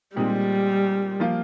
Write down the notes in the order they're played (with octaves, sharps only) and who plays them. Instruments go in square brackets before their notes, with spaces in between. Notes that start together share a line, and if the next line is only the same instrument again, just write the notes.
[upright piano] A#2 G#3 C4 D#4 G4 [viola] G3
[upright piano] F3 A#3 F4